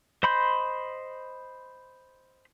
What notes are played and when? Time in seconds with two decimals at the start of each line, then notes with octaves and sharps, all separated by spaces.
0.23 C5 D#5 B5 C6 G6